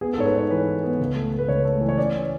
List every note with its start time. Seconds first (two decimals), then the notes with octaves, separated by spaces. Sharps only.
0.01 B3 G#4
0.13 A4
0.18 G#2 C#5
0.26 B4
0.34 G#2 C#5
0.50 E3 B4
0.66 E4
0.83 B3
1.00 C#2
1.15 A3
1.32 A3
1.39 B4
1.49 C#2 C#5
1.65 A3
1.81 E3
1.89 C#5
1.98 C#4 D5